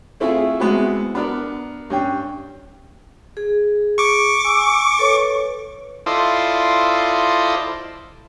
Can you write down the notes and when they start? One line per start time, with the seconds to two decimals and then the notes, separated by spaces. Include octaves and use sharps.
0.20 A3 C4 E4 F4 G#4
0.60 G#3 B3 C4 E4 F#4
1.15 B3 D4 A#4
1.90 G2 C#4 G5
3.37 G#4
3.98 C#6 D6
4.45 G#5 E6
4.99 A4 B4 C#5
6.06 E4 F4 A4 C5 D5 D#5